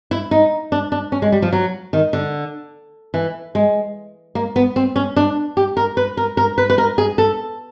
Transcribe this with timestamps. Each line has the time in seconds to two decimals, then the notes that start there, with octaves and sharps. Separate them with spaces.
0.11 E4
0.31 D#4
0.72 D4
0.92 D4
1.12 C#4
1.22 G#3
1.32 G3
1.42 F3
1.53 F#3
1.93 D#3
2.13 D3
3.14 E3
3.55 G#3
4.35 A#3
4.56 B3
4.76 C4
4.96 C#4
5.16 D4
5.57 G4
5.77 A#4
5.97 B4
6.17 A#4
6.37 A#4
6.58 B4
6.70 B4
6.78 A#4
6.98 G#4
7.18 A4